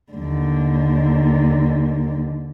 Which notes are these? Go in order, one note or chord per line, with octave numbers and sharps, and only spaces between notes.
D#2 D3